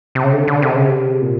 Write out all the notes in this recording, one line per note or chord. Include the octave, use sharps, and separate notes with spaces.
C3
C#3
D3
D3
C3
C#3
C3
A#2